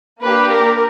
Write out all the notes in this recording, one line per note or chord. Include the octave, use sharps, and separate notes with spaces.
A#3 D4 G4 B4
A#4